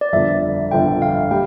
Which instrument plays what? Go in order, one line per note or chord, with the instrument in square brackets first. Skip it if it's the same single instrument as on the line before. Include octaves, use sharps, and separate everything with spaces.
[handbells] D5
[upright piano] G1 F2 D3 [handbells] E5
[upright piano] G1 F2 D3 [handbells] G5
[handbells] F5
[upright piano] G3 [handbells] G5